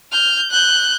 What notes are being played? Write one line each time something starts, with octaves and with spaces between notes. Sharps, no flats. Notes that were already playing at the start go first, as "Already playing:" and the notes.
F6 G6
F#6 G6